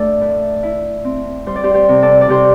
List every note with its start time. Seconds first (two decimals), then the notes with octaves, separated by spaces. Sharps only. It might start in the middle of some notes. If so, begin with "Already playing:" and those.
Already playing: A3 D4 A4 D5
0.21 A2
0.63 E4
1.04 C4
1.46 G3 C5
1.56 D5
1.64 G4 C5
1.74 G4 C5
1.89 C3
2.02 A4 D5
2.21 D5
2.29 C3 G4 C5